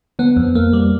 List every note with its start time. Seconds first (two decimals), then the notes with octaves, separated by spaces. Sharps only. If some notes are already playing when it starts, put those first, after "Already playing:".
0.19 D3 B3
0.37 F2
0.55 F2 A#3
0.73 G3